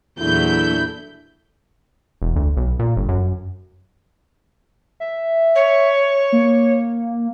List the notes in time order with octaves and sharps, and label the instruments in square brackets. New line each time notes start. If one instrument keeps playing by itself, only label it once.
[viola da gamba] E2 A#2 F#3 [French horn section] D4 E4 A4 [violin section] B5 G6
[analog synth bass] E1
D2
B1
A#2
G1
F#2
[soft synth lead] E5
[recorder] C#5
[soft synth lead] A#3